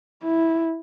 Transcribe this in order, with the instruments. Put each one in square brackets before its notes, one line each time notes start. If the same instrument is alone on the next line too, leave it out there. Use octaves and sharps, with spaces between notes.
[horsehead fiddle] E4